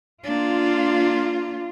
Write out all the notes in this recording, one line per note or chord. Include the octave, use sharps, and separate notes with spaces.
A#3 D4 F4